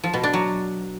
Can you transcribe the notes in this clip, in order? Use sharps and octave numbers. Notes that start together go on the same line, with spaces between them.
F3
B2
D4
F#3